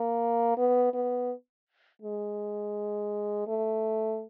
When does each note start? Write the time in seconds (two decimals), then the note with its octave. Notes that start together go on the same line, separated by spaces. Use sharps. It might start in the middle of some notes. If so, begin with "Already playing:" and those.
Already playing: A#3
0.57 B3
0.93 B3
2.02 G#3
3.47 A3